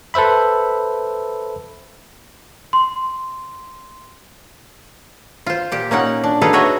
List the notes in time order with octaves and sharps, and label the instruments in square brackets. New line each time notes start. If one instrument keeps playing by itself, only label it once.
[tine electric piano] A4 B4 C5 E5 B5
[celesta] C6
[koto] F4 C5
A#2 G4
A#3 C#4 D#4 F#5
D4
D#4 F4 G#4 A4 B4 F5
F#4 B4 C#5 D#5 E5